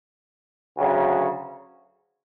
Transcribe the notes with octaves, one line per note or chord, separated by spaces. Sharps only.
D2 C#3 F#3